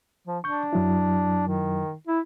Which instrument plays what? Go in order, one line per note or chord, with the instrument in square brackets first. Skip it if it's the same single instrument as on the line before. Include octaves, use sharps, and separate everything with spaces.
[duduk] F3
[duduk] D4 [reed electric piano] C#6 G6
[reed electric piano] F#2 F#3 E4
[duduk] D#3
E4